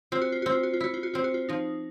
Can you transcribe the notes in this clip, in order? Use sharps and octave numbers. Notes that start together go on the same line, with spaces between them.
C4 F4
F#4
F4
C4 F#4
F4
F#4
F4
E4 F#4
F4
F#4
C4 F4
F#4
F4
F3 D#4